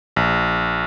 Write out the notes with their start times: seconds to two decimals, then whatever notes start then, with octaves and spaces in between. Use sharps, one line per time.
0.16 A#1